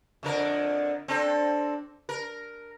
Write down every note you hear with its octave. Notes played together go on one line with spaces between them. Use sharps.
F2 D3 A#4
C4 D4 A4
A#4